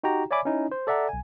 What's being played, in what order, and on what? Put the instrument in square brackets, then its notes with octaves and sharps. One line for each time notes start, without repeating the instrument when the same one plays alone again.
[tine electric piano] D#4 F#4 G4 G5 A#5
C#5 D5 E5 G#5 B5 D6
C#4 D#4 E4
C5
A4 D5 E5 F#5 A#5
B1 G#5